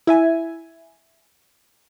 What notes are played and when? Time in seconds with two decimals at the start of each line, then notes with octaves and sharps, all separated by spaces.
0.07 E4 E5 G#5